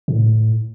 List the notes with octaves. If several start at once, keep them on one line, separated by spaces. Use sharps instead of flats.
A2